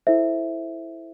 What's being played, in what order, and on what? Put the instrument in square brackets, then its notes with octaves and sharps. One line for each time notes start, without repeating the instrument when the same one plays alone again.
[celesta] E4 A4 C5 E5